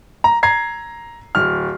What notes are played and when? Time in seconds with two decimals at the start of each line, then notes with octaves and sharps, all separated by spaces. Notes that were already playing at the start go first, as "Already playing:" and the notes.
0.24 A#5
0.43 A#5 G#6 C7
1.35 D1 F6